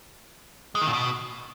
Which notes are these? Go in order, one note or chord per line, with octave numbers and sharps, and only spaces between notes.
G#3
D#3
A#2
B2